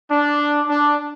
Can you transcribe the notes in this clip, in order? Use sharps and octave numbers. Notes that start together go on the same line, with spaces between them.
D4
D4